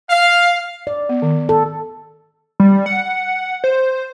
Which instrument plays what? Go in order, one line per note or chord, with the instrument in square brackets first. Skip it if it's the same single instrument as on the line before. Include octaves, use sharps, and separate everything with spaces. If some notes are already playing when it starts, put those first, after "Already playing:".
[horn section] F5
[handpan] D5
[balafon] B3
D#3
[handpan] A4
[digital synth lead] G3
F#5
C5